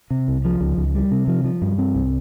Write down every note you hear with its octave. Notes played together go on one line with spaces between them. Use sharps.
C3
C2
F3
C#2
C#2
G3
C3
F3
F3
G2
C4
C2